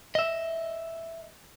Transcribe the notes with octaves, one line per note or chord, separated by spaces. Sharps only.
D#5 E5